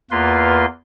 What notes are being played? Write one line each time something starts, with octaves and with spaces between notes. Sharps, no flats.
E2 A#3 F4 B4 C6